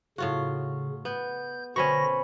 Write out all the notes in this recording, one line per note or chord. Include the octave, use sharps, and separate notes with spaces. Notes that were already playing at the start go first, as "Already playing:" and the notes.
A2 C#3 F4 F#4
B3 G6
B2 D3 C4 C#4 G#5 B5 C#6 A#6